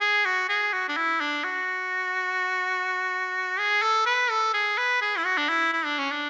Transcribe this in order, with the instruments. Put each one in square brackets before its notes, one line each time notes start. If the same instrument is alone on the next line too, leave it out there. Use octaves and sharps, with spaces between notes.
[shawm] G#4
F#4
G#4
F#4
D4
E4
D4
F#4
G#4
A4
B4
A4
G#4
B4
G#4
E4
F#4
D4
E4
E4
D4
C#4
D4